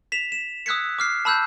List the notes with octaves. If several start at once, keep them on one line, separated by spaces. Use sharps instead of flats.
B6 E7 F7
E7
D#6 E6 F#6 G#6 B6 C#7
D6 F6 C7
A5 B5 E6 F#6 G6